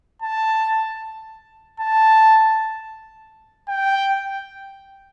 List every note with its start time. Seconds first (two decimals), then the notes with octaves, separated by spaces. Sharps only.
0.22 A5
1.80 A5
3.69 G5